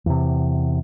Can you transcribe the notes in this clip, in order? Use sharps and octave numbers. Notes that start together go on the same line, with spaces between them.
E2 C3